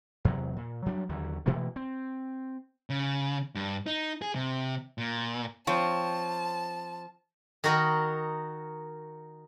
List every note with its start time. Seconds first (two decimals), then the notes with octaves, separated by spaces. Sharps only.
0.25 E2 C3 F#3
0.57 A#2
0.86 F#3 G3 D4
1.09 D#2 D3 F#3
1.46 B2 E3 A3 A#3
1.76 C4
2.90 C#3
3.55 G2
3.87 D#4
4.22 G#4
4.35 C3
4.98 A#2
5.67 F3 C4 C#5 G5 A5
7.64 D#3 D#4 F#4 A#4 D#5 B5